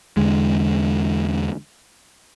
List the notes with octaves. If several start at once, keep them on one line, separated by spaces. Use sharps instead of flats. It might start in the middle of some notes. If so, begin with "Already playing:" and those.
E2 D3 G#3